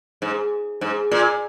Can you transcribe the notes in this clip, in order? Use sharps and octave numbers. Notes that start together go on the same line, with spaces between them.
G#2
G#2
A#2